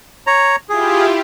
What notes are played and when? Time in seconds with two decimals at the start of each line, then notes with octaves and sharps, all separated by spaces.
0.27 C#5 A#5
0.69 E4 F4 G4 G#4